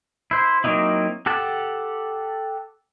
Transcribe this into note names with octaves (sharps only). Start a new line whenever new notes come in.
E4 C5
F#3 A#3 C4 D#4 E4
G4 A4 F#5 A5